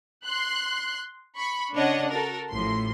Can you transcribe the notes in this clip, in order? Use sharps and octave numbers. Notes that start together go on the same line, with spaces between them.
C6 F#6
B5 C#6
C#3 D4 C#5 D#5 F#5
F#4 A4 A#4
A1 A2 F3 C6